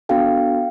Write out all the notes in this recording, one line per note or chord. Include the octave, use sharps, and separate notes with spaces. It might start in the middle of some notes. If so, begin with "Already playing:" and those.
B3 D4 F#4 A4 F5 G5